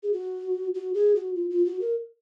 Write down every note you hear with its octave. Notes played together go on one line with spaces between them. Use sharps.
G#4
F#4
F#4
G#4
F#4
F4
F4
F#4
A#4